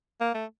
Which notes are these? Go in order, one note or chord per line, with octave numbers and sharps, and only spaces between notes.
A#3
A3